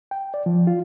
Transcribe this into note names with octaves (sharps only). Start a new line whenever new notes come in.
G5
D5
F3
F4